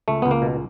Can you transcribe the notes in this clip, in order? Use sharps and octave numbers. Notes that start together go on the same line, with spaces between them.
C#2 A3
C#2 B3
A#3
B2